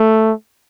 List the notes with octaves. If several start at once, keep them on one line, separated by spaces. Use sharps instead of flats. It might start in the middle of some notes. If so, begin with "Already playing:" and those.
Already playing: A3